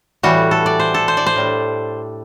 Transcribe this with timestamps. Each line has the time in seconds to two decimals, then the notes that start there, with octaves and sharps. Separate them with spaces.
0.23 A2 E3 G3 F#4
0.51 A4
0.66 D5
0.79 C5
0.94 A4
1.08 C5
1.17 D5
1.26 C5
1.36 A2 G3 D4